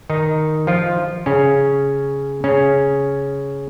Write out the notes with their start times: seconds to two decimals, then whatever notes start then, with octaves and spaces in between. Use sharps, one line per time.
0.10 D#3 D#4
0.67 F3 F4
1.26 C#3 C#4
2.44 C#3 C#4